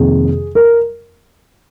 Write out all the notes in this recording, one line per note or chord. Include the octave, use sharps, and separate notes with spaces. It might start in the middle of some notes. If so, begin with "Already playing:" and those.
Already playing: F2 C3 D#3 A#3 G#4
A#4